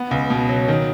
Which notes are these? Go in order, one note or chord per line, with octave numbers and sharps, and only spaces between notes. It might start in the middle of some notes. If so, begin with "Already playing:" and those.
Already playing: B3
C#2
B2
F#3
D#3